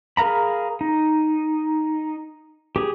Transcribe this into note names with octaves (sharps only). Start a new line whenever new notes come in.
G#4 A#4 F5 A#5 B5
D#4
G4 G#4